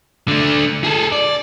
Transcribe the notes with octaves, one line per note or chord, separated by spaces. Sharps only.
D3 A3
G#4 A4
D5